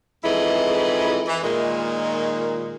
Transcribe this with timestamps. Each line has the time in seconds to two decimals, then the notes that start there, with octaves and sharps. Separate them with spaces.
0.24 F2 G#2 E3 E4 G#4 D#5
1.27 E3
1.42 A#2 D#3 G#3